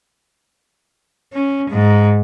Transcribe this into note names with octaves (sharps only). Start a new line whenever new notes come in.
C#4
G#2